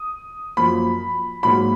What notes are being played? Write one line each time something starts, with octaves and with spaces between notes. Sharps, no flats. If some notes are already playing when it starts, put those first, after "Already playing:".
Already playing: D#6
F#2 F3 A#3 B5
G#2 F#3 A#3 B5